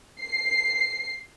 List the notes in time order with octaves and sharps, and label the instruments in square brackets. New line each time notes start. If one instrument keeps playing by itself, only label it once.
[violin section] C7